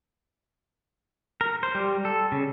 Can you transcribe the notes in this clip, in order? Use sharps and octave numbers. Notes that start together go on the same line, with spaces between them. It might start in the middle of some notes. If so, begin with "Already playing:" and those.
A#4
C5
G3
A4
C#3